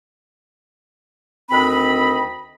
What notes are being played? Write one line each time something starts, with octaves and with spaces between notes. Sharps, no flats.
D2 D#3 C4 D#5 B5